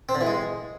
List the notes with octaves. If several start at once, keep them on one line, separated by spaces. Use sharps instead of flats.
C4
D3
E3
G#3